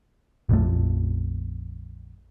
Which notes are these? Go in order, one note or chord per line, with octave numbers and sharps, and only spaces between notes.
A#1 F2 F3 A3